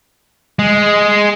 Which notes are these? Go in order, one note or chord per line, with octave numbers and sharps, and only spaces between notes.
G#3